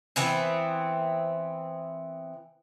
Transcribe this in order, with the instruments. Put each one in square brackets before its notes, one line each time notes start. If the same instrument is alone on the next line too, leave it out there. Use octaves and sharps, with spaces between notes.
[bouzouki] E3 B3 C4